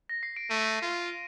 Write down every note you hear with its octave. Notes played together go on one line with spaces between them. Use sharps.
A#6
C7
D7
A3 D#7
F4